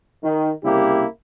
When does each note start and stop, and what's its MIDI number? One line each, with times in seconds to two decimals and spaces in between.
0.24 0.50 51
0.64 1.05 36
0.64 1.05 49
0.64 1.05 58
0.64 1.05 64
0.64 1.05 67